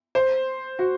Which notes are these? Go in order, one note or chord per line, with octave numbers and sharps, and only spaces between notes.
C5
F#4